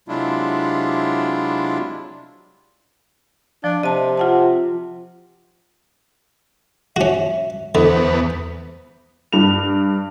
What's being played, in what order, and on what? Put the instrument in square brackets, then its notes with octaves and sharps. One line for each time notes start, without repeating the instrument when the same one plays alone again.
[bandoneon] C3 F#3 G#3 D4 E4 F4
[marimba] F3 [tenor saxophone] D4
[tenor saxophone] C3 [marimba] D#5 A5
[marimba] F4 F#5 A5
[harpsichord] C#4 F#4 [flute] E5
[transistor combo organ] E2 B3 [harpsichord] D3 [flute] C5
[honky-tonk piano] G2 F7